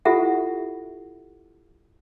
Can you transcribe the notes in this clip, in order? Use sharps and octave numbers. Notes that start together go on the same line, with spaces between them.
E4 F4 G4 A4 E5 F#5